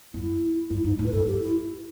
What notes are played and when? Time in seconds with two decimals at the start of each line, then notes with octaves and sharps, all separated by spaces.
0.14 F#2 E4
0.70 G2 E4
0.84 G2 D#4
0.99 A2 E4
1.06 B4
1.12 G2 A4
1.27 F#2 G4
1.41 E4